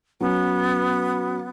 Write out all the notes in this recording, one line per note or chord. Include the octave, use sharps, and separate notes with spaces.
F#3 B3 C#4